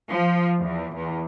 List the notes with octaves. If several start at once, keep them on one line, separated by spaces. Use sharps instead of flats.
F3
E2
E2